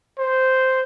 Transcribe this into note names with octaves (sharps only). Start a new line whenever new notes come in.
C5